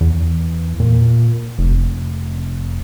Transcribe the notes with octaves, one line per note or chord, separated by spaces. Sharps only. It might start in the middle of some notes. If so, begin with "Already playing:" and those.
E2
A#2
F1